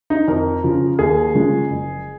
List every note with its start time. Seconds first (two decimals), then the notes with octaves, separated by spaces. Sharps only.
0.10 D#4
0.28 F2 A#4
0.64 C#3 F3
0.99 D#2 G#4
1.35 C#3 F3 G#3
1.70 F#1